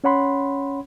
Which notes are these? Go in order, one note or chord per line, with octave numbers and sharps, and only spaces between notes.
C#4 C#5 F#5 B5 C6